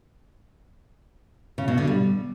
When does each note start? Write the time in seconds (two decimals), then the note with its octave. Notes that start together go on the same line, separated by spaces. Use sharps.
1.58 C#3
1.68 B2
1.78 D3
1.87 G3